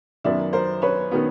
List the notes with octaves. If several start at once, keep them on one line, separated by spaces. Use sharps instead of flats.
F#2 D#3 F#3 B3 D5 E5
A#4 C5
B4 C#5
D#3 F#3 B3